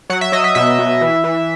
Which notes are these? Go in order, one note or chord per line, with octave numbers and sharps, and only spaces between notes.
F#3 F#5
E5
F#3 D#5
E5
B2 E5
B2
E3
E3